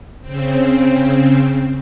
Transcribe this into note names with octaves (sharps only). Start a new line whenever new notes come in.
C#3 C4